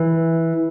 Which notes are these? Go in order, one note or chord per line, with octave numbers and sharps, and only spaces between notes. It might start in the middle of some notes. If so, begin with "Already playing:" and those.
Already playing: E3